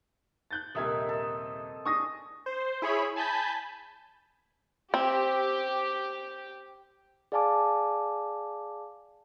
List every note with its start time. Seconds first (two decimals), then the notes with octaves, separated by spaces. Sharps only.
0.51 F#6 G6 A6
0.75 D#1 C3 A#4 D#5 E5 G#6
1.09 A4 D#5
1.85 D4 G#4 A4 C#6 D#6 A#6
2.46 C5
2.82 E4 G#4 C#5 B5
3.16 G#5 A5 B5 G6 B6
4.94 C4 G4
7.32 G#4 D5 F5 G#5 A5 D6